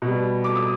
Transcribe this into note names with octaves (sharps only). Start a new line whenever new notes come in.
B2
G3
D6
D#6